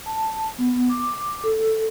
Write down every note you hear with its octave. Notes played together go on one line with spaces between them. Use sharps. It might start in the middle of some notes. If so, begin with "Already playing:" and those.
A5
B3
D6
A4
A4